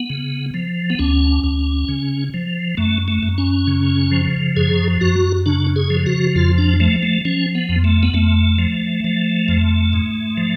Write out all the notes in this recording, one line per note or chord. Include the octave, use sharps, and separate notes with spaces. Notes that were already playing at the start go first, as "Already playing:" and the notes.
Already playing: B3
C#3
F3
B3
D2 C#4
D2
C#3
F3
F#2 A3
A3
F#2
C#4
C#3
F3
F#2 G#4
F#2 F#4
C#3 D4
G#4
F3
F#4
F2 F4
D4
F3 A3
A3
F3 C#4
B3
F2
A3
B3
F2 A3
F3
F3
F2
G#2
F3